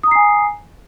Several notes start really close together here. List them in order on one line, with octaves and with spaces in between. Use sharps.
D#6 A#5 C7 G#5